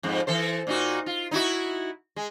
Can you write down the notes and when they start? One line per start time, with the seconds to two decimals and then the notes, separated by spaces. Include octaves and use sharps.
0.03 F2 G#2
0.27 E3 A4 C5
0.67 A#2 D#4 F#4
1.06 F4
1.31 D#4 E4 F#4
2.16 G#3